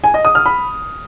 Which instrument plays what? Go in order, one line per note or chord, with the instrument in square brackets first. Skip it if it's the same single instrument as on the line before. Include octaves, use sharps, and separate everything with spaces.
[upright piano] G#5
D#5
D#6
F6
B5